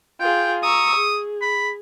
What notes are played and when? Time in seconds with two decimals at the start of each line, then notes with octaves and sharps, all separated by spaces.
0.20 F4 G#4 G5
0.63 A#5 C#6 D#6 E6
0.96 G#4
1.42 B5